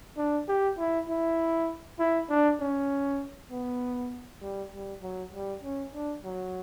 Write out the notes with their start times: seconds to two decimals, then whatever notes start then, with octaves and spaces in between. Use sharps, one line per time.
0.17 D4
0.48 G4
0.78 E4
1.09 E4
1.99 E4
2.29 D4
2.60 C#4
3.51 B3
4.41 G3
4.72 G3
5.02 F#3
5.33 G3
5.63 C#4
5.94 D4
6.24 F#3